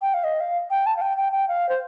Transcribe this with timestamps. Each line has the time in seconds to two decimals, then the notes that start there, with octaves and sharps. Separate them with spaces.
0.02 G5
0.14 F5
0.24 D#5
0.40 F5
0.70 G5
0.86 A5
0.97 F5
1.01 G5
1.17 G5
1.32 G5
1.48 F5
1.69 C5